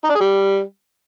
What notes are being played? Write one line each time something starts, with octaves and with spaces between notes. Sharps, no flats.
D#4
D4
G#4
G3